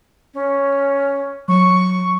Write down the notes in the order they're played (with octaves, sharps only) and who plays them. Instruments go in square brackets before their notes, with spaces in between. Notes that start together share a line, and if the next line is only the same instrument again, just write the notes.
[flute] C#4
[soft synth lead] F#3 [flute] C#6